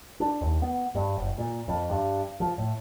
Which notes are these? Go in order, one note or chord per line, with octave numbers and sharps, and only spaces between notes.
D4
D#2
B3
G2
F#1
A#2
F2
G2
F3
A2